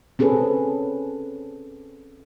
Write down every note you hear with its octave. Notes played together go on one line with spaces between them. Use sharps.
C4 C#4 G#4 A4 B4